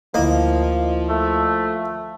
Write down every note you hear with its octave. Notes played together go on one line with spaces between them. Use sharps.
D2 F3 A#3 E4 D#5
A3